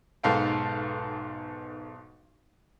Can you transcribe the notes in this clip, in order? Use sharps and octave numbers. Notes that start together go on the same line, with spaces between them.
B1 G#2 A4 F5 G5